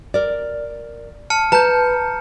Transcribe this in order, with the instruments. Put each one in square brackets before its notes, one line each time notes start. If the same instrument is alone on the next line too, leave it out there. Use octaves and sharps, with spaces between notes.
[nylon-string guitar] A#4 D5
[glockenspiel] A5 F6 C#7
[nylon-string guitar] B4 A5 [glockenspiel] A#5 G6